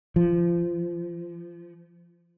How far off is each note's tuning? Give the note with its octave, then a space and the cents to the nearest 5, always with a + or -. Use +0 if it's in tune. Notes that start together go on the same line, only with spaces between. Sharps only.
F3 -25